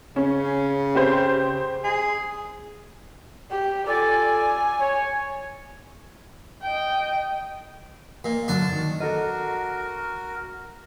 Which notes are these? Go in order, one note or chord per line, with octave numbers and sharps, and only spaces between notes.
C#3 C#4
C4 G4 C5
G#4
G4
F4 A4 D5 G#5
C#5
D#5 G5
A#2
F#2 D3 F#3 D4 A5
D#3
F#4 A4 A#4 D#5